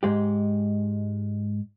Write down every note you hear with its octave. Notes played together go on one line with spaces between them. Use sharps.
G#2 G#3 G4